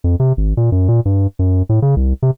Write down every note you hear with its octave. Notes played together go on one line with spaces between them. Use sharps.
F2
C3
G#1
A#2
F#2
A#2
G2
F#2
A2
C#3
C2
C3